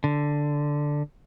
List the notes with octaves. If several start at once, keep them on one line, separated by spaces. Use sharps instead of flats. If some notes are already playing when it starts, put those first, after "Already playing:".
D3